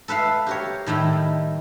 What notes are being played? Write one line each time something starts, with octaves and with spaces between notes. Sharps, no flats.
A4 B4 E5 F5
G4 A#4 C#5
A2 D#3 G3 E4